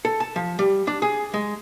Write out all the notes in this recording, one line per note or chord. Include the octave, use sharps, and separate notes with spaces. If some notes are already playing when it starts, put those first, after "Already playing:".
A4
A5
F3
G3
D4
G#4
G#3